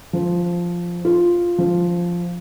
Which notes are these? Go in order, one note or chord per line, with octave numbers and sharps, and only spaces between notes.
F3
F4
F3